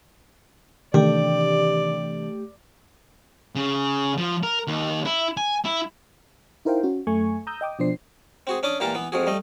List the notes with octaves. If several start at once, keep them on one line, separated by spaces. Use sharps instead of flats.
C3 D#3 E3 A3 D4 G4 D5
C#3
F3
A#4
D#2
E4
G#5
E4
D#4 E4 A#4 C5 F5 G5
C#4 F#4
F#2 A3 G#5 C#6
A#5 D#6 E6 G6
D#5 G5 D6 D#6
B2 F3 D4 C5 C7
C4 F#4 G#4
C#4 D4 D6 D#6
A#2 E3 G4 A#4 A5
E3 B3
F2 F3 F#4 G#4
G3 A3 D#5